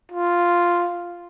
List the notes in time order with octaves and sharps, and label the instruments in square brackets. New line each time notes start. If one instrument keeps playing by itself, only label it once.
[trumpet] F4